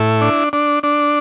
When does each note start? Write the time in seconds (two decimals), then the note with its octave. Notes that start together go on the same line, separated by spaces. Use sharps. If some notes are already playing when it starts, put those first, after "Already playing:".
Already playing: A2 E4
0.21 D4
0.53 D4
0.83 D4